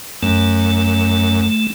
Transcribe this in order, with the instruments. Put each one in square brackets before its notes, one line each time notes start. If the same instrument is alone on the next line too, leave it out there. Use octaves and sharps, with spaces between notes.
[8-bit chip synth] F#2 [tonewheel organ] A3